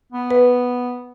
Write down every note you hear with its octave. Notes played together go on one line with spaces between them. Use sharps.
B3
B4